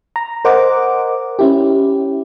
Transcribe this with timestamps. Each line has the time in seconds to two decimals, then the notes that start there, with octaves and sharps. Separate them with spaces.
0.16 A#5
0.45 A#4 C5 D#5 F#5 D6
1.39 C#4 E4 G4